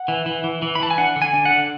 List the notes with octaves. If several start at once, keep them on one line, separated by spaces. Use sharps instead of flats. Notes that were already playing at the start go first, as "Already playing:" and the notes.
Already playing: F#5
E3
E3
E3
E3
B5
E3 A5
G#5
D4 F#5
D3
G#5
D4
F#5
D3